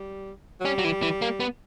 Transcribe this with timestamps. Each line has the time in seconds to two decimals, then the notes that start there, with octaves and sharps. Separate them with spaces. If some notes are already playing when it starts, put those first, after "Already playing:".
Already playing: G3
0.60 F#3
0.65 G3 C#4
0.78 F#3
0.84 E3
1.02 E3
1.22 A#3
1.40 B3